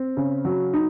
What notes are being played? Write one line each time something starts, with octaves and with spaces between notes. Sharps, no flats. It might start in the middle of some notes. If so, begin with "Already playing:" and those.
Already playing: C4
C#3
F#3
D#4